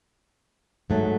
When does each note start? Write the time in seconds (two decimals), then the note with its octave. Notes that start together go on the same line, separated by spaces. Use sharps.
0.90 G#2 F#3 A3